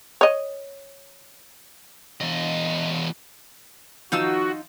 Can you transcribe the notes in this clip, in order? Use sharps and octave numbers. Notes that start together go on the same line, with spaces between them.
C#5 D#5
E2 D#5
D#3 F3 D#4 F4 F#4 E6